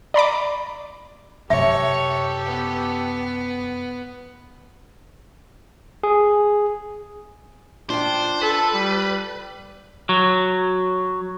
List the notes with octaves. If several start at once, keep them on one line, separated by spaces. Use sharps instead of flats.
D5 A#5 B5 D6
F#2 C3 G4 A4 C#5 E5
B3
G#4
D4 F4 C5 D5 G5 C6
A4 B4
G3
F#3